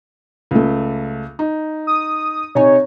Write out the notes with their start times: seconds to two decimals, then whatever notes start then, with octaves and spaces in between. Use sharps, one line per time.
0.51 C#2 A3
1.39 D#4
1.87 D#6
2.55 C3 D#4 C#5 G#5